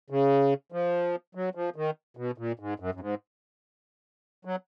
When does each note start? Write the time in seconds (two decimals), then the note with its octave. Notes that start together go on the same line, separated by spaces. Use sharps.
0.10 C#3
0.72 F3
1.35 F#3
1.55 F3
1.76 D#3
2.17 B2
2.38 A#2
2.59 G#2
2.80 F#2
2.95 F#2
3.00 G#2
4.45 F#3